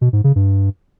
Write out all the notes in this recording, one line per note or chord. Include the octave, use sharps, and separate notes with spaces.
B2
G#2
C#3
G2